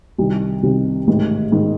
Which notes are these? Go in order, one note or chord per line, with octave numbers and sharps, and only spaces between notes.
C2 C3 D#3
C2 C3 D#3
A1 G#2 D#3
G#2 D#3